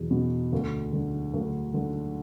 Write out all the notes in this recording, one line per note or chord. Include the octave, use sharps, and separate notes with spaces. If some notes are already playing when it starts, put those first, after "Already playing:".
Already playing: E2 B2
B2
D2
D3
D2
D3